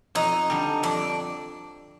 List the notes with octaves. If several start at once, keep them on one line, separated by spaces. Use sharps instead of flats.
F2 D#4
D3 G3
F2 D4